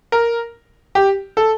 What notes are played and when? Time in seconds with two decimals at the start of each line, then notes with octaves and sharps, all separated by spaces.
0.12 A#4
0.95 G4
1.37 A4